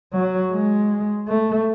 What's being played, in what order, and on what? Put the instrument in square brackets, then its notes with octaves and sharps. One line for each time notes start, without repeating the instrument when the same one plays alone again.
[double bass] F#3
G#3
A3